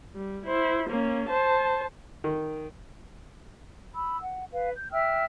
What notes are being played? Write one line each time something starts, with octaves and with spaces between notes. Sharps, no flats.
G3
E4 C5
A#3 C#4
C5 A5
D#3
B5 E6
F#5
B4 F5
G6
E5 G5 E6 F6